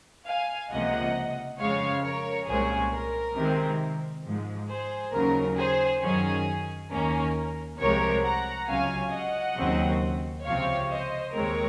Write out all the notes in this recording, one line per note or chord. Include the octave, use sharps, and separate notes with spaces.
F5 G#5
C#2 C3 F3 A#3 D#5 F#5
F2 C#3 G#3 C#5 F5
A#4 C#5
C2 A#2 G#3 C#4 G#4 C5
A#4
C3 D#3 G#3 C4
G#2 F3 G#3
G#4 C5
D#2 C#3 F#3 A#4
G#4 C5
F#2 D#3 F#3 C#4 G#4
D#2 D#3 A#3 C#4 A#4
C2 C3 F3 G#3 A#4 C#5
F#5 A#5
C#2 C3 F#3 C#4 F5 G#5
D#5 F#5
D#2 C#3 F#3 C4
C#2 C3 F3 C4 C#5 F5
C5 D#5
D#2 D#3 G#3 C4 A#4 C#5